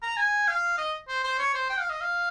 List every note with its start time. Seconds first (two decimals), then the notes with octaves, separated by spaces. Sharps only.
0.02 A#5
0.17 G#5
0.48 F5
0.78 D#5
1.08 C5
1.24 C5
1.39 C#5
1.54 C5
1.70 G5
1.80 F5
1.90 D#5
2.01 F5